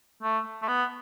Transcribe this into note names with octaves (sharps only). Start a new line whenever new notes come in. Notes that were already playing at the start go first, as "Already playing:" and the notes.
A3
A3
B3